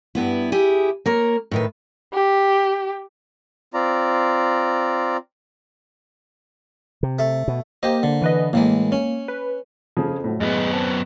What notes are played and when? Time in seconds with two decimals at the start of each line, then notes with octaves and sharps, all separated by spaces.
0.15 G2 B3 E4
0.52 E4 G4 G#4
1.06 A#3 A#4 C#5
1.51 A2 D#3 B4
2.13 G4
3.74 C4 F4 D5 A#5
7.03 C3
7.19 A3
7.48 B2
7.83 A#3 G4 C5 D#5
8.03 D3
8.22 E3 B4 D#5
8.53 A2 E3 G#3 A#3
8.92 C#4
9.28 B4
9.97 F2 C#3 F3 G#4
10.24 A2 F#3
10.40 F#2 G#3 B3
10.73 C4 A5